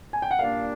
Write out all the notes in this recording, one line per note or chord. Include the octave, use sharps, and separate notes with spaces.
G#5
G5
F#5
A#2 G3 A#3 D4 F5